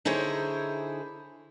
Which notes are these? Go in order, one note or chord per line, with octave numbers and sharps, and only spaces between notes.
D3 D#4 E4 G#4 C5 C#5